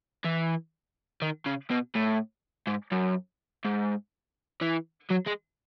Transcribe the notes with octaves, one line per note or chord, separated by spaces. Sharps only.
E3
D#3
C#3
B2
A2
G#2
F#2
G#2
E3
F#3
G#3